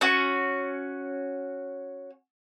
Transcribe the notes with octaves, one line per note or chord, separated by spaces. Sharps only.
C#4 F#4